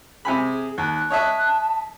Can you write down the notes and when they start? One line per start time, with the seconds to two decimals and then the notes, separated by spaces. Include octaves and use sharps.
0.25 C3 G#4 G#5 B5
0.78 D#2 F#6
1.10 C#5 D#5 E5 A5